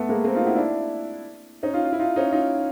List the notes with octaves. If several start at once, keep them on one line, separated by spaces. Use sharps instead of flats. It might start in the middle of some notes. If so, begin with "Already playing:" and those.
Already playing: A3 B3
G#3 A#3
A#3 C4
D#4 F4
E4 F#4
D4 E4
C#4 D#4
D#4 F4
F4
E4
D#4 F4
C#4 D#4
D#4 F4